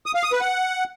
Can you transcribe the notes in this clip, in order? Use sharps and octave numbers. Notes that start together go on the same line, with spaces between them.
D#6
F5
D#6
B4
F#5